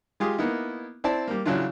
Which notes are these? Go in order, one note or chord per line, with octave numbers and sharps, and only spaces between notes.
G#3 F4 G4 G#4
A#3 B3 D#4 E4
C4 E4 D5 A5
G3 A#3
C#3 E3 F#3 D4 E4 F4